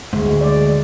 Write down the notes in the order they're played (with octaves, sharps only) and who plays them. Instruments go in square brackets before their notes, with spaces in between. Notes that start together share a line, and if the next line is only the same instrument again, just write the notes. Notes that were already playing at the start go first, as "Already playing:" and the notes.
[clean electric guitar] D2 G#2 [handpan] G#3
[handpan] G#3 D5